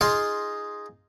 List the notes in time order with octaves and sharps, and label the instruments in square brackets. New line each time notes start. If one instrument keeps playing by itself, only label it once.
[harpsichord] D#4 F4 G#4 D#5 F5 C6